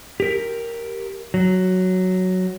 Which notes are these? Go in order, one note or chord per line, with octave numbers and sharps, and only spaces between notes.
G4 A#4
F#3